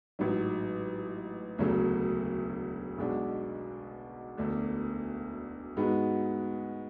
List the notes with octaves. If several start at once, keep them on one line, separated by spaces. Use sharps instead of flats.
A1 G#2 F#3
E1 D2 C#3 F#3 A3
B1 B2 G#3 D4 F#4
E1 D2 D3 A3 D4
G#2 G#3 B3 F#4